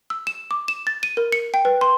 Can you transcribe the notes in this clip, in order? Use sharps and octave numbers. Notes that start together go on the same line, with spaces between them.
E6
E7
D6
E7
A6
D#7
A#4
C#7
G5
B4
C6